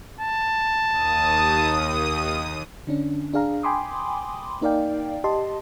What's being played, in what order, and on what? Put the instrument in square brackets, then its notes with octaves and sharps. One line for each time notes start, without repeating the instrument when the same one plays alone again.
[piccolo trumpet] A5
[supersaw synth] D#2 D#6
[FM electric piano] D3 C#4 D4
D4 G#4 F5 A#5
G5 G#5 B5 C6 D6 D#6
A#3 D#4 A#4 D5 F5 G5
G4 D#5 A5 C6